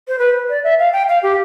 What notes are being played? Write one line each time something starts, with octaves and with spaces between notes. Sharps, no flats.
C5
B4
D5
E5
F5
G5
F5
G4